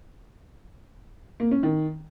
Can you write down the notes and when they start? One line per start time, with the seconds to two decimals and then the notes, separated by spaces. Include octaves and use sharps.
1.40 A#3
1.51 C#4
1.63 D#3